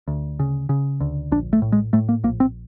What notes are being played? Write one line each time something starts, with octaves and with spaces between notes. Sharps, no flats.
D2
C#3
C#3
D2
A#1 D4
A3
A2
G#3
A2 A3
A#3
A#1 A#3
C4